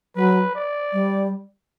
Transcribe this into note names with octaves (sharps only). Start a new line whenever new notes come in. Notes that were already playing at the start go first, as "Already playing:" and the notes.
F#3 B4
D5
G3